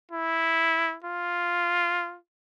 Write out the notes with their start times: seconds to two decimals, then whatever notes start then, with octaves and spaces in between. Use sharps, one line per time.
0.12 E4
1.04 F4